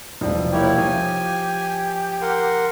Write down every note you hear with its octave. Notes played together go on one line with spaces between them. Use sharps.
E1 C2 F3
A#3 E4 G4 C#5
F3 G#5
A#4 F#5 C6